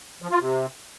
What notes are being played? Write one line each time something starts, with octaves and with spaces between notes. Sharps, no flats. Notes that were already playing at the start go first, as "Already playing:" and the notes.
F3
F4
C3